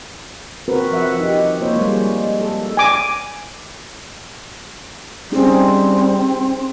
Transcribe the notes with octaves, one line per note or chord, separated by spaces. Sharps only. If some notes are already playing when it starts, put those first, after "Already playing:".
C4 F#4 A#4 B4
F3 E5 F#5
D#4 G4
A#3 F4 C5 C#5
G3 G#3
A4
G#5 D6
G3 C4 C#4 D#4 G#4